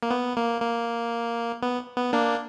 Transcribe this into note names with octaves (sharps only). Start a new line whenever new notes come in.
A#3
B3
A#3
A#3
B3
B3
A#3 D4